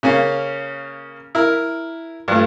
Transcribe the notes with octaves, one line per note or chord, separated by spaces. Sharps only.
C#3 A#3 C#4
E4 A#4
G2 F3 A3